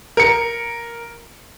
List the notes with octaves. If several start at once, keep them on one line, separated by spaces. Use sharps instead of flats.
A#4 C#7